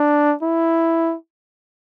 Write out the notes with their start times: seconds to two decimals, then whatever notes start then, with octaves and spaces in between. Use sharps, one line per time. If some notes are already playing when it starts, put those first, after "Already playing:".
Already playing: D4
0.42 E4